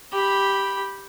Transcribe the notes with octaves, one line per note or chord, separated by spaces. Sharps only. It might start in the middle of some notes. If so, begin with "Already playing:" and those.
G4 B5